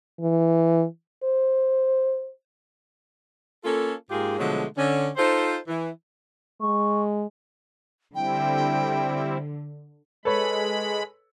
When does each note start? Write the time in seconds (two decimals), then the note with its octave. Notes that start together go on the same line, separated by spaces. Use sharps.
0.21 E3
1.23 C5
3.64 A#3 C#4 F4 A4
4.10 G#2 A#3 F4 G4 G#4
4.39 B2 D3 F3 F#3 G#3 A3
4.77 D3 C#4
5.17 D#4 F4 A4 C5
5.67 E3
6.61 G#3 C#6
8.15 D3 G3 C4 E4 G5
10.25 G#3 A4 B4 C#5 B5